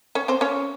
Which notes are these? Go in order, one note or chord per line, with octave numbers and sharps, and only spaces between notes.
C#4 C#5
C4 C5
C#4 C#5